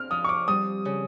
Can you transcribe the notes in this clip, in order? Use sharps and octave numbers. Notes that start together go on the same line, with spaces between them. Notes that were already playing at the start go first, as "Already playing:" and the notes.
Already playing: C4 F6
F3 D#6
C#6
D6
G3 D#6
C#3